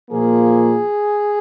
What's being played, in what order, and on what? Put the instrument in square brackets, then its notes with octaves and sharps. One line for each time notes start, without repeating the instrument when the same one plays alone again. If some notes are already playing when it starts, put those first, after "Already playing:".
[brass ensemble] A#2 F3 A#3 G#4